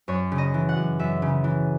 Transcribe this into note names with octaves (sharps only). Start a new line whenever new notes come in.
F#2 C#5
C#3
D#5
E3
F#5
F#2
F#2 E5
C#3
E3